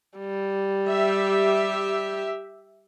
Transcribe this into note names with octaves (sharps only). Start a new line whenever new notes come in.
G3
G4 E5